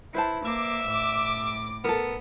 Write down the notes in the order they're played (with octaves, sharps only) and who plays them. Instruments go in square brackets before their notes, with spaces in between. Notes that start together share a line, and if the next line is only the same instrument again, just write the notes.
[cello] E4 [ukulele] B4 C5 A5
[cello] A#3 [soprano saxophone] E5 [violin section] D6
[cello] A2 [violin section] D6
[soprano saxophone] B3 [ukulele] A4 A#4